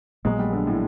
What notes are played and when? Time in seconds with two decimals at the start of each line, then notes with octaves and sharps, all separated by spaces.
0.25 A#1 A#2 F#3 G#3 B3
0.39 G3
0.53 D3
0.67 A2